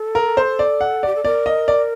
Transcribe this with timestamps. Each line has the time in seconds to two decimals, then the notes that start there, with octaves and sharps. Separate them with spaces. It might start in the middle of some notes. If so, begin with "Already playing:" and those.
Already playing: A4
0.15 A#4
0.37 C5
0.59 D5
0.81 F#5
1.03 G4 D5
1.16 A4
1.25 A#4 D5
1.46 D#5
1.68 D5